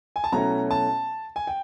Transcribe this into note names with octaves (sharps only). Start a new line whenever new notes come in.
G#5
A5
B2 F#3 A3 C#4 E4 A#5
A5
G#5
G5